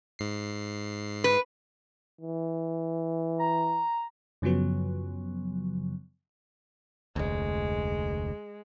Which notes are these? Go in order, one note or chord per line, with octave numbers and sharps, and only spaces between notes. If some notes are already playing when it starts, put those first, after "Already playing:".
G#2 C7
B4
E3
A#5
F#2 C#3 F3 F#3 B3
F1 D2 G#3